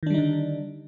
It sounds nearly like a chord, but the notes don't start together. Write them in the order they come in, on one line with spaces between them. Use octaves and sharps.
D#3 D4 G3 D#4 D3